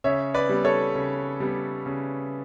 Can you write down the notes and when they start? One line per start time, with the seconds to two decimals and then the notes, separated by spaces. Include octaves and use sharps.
0.04 C#3 C#5 E5
0.34 B4 D5
0.49 G3 B3
0.64 A4 C#5
0.95 C#3
1.40 G3 B3
1.86 C#3